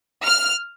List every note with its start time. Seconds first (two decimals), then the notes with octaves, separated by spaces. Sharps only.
0.26 F6